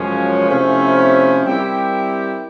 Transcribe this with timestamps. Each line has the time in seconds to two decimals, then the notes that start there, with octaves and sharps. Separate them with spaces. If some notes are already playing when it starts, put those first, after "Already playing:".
Already playing: F#2 C#3 F3 G#3 C#4
0.48 C3 F3 A3 C#4 E4
1.45 G3 C4 E4 G4 A#4